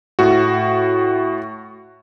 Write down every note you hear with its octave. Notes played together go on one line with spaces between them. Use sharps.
A2 F#4